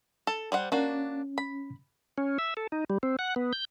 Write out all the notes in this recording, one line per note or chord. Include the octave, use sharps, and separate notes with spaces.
A4
G3 C5 F#5
A#3 C#4 D4 F#4
B5
C#4
E5
A4
D#4
G3
C4
F#5
B3
G6